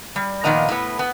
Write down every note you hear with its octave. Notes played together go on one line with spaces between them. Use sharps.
G3
A#2 D#3 F3 B3 D#5 A#5
A2 B3
B3